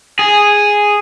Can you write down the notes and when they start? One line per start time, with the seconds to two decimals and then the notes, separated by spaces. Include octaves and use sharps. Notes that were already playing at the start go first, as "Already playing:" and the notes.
0.19 G#4